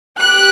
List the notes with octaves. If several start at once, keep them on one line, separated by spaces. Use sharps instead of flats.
G4 F#6